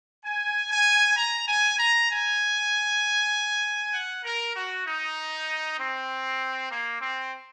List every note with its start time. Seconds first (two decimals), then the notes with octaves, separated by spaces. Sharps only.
0.24 G#5
0.71 G#5
1.16 A#5
1.47 G#5
1.79 A#5
2.09 G#5
3.94 F#5
4.24 A#4
4.55 F#4
4.86 D#4
5.78 C4
6.70 A#3
7.01 C4